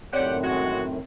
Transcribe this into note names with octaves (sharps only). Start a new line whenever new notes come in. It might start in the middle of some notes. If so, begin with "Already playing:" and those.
F#2 A2 D#3 C4 G4 C#5 D5 F#5
G#3 F#4